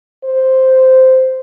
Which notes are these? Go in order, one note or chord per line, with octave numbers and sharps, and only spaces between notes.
C5